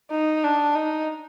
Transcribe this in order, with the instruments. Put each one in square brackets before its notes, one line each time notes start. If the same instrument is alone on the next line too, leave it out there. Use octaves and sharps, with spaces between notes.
[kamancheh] D#4
D4
D#4